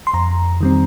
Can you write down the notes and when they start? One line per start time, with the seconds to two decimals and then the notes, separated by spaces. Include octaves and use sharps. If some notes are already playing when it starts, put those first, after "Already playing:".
0.07 C6
0.14 F2 A#5
0.61 D#3 G3 C4